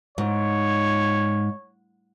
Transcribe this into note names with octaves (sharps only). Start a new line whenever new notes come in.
G#2 C#5